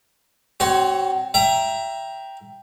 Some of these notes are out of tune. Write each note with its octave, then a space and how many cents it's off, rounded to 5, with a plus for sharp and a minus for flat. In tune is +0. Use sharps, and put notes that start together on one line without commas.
C4 +0 F#4 +35 C#5 +0
E5 +20 G5 +0 A#5 +15